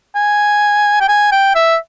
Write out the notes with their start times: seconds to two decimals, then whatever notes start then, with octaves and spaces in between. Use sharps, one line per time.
0.15 G#5
1.01 G5
1.09 G#5
1.32 G5
1.55 E5